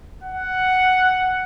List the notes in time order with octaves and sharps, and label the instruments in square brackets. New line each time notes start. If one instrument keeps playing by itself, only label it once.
[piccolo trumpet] F#5